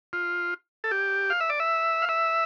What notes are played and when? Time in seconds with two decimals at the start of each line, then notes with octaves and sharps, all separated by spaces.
0.13 F4
0.84 A4
0.91 G4
1.30 F5
1.40 E5
1.50 D5
1.60 E5
2.02 F5
2.09 E5